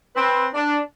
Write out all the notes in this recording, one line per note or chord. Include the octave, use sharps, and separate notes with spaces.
C4 B4
D4